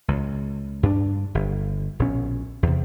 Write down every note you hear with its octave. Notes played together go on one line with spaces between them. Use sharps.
C#2
G2 D4
G1
A#1 B2 C#4
E2 C3